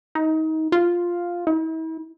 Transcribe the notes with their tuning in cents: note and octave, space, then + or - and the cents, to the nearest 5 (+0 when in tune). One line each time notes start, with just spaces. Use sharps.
D#4 +25
F4 +0
E4 -45